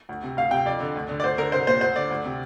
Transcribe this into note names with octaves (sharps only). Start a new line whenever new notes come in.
D2
C3
D2 F5
C3 G5
F2 D5
D3
D2
D3
D5
D2 C5
D3 A#4
C2 C5
A#2 C5
D2 C5
D3 D5
D2
C3